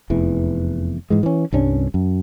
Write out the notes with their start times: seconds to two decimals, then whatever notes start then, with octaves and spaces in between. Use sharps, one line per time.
0.10 F1 E2 E3
1.10 G#2 E3 G#3
1.23 E3 C#4
1.53 C2 G2 C#4 D4
1.94 F#2